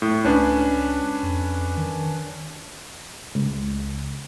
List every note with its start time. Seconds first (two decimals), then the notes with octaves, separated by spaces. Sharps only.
0.02 A2
0.25 C#2 C#4 D4 B4
1.23 F2
1.77 D#3
3.35 C#2